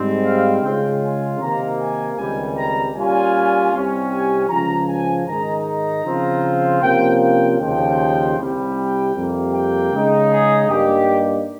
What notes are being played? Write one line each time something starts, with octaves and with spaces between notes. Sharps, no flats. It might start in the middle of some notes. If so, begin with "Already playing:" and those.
Already playing: G#2 G3 C4
F5
C#3 G#3 C#4 F4 G5
G#5
C3 D#3 A#3 A#5
G#5
C#2 C3 D#3 G3 G#5
A#5
A#2 G3 C#4 F4 G#5
C2 C3 G3 C#4
G#5
C#2 C#3 F3 A#5
G#5
G#2 D#3 G#3 D#4 A#5
A#5
C#3 F3 C4 F4
C3 F3 A#3 C#4 G5
G5
D#2 C#3 F3 G5
C2 C3 G3
G5
F2 C3 G3 A#3
G5
C#3 G#3 D#4
G#4
G2 G3 A#3 D#4 G4